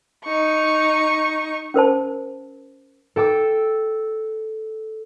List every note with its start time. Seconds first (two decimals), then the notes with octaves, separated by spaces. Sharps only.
0.25 D#4 C#6
1.74 C#4 A#4 C5 A5
3.16 A4 G5 D6 E6